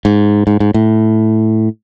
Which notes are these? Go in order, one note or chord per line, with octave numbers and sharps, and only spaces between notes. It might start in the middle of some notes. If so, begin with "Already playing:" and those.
G#2
G#2
G#2
A2